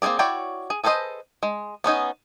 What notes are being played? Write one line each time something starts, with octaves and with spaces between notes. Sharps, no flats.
A#3 C4 E4 G#4 D5
E4 F#4 C#5 D5 G5
G#4
G#4 A4 B4 C5 D#5
G#3
B3 C#4 D#4 G#5